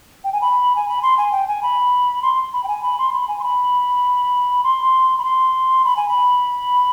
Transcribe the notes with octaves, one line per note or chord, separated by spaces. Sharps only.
G5
G#5
B5
G#5
B5
C6
G#5
G5
G#5
B5
C6
B5
G5
G#5
B5
C6
B5
G#5
C6
B5
C6
B5
C6
B5
G#5
B5